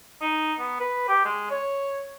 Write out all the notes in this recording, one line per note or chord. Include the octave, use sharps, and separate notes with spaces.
D#4
B3
B4
G4
G#3
C#5